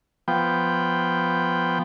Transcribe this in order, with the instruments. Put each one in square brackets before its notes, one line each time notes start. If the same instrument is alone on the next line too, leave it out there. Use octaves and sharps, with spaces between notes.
[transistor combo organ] F3 B3 G5